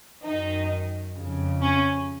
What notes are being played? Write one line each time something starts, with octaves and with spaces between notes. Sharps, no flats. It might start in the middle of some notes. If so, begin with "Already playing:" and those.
F#2 D#3 D#4
F2 C#3
C#4